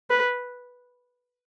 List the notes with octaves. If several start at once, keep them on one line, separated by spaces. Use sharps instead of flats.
B4